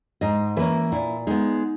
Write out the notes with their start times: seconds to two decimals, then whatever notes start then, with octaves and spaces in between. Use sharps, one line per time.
0.21 G#2 D#5
0.56 E3 A#3 C#4 B4
0.92 A#2 E4
1.27 G#3 B3 D#4